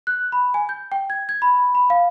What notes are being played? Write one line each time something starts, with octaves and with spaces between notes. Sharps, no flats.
F#6
B5
G#5
G6
G5
G#6
G#6
B5
B5
F5